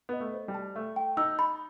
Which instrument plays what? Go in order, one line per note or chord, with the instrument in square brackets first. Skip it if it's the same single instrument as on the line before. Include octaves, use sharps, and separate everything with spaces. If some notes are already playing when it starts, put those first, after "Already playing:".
[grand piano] B3 [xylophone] D#5
[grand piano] A3
[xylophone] C5
[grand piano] G3
[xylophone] A5
[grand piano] A3 [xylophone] E5
[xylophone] G5
[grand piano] D#4 [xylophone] E6
[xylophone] B5